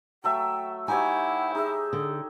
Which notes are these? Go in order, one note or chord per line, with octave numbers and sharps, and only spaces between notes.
F#3 A3 E5 G5
D#4 E4 G4 C#5 F#5 G#5
D#4 G#4 E5
D3